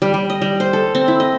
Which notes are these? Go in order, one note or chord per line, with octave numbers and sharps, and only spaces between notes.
G3
G3
D#5
G3
C5
A4
C4
E4
D#5